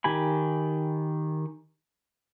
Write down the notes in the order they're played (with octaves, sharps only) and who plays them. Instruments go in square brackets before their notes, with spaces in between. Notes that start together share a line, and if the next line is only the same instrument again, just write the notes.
[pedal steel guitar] D#3 G4 G#5 B5